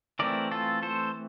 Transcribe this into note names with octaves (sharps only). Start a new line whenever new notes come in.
E3 A3 C4 A#4 D5
F4 A4
A4 C5